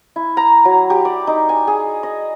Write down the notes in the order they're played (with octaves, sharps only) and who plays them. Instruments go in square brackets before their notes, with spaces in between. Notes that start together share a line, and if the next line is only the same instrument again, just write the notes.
[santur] E4
A#5
F#3
G4
D5
D#4
G#5
G#4
D#5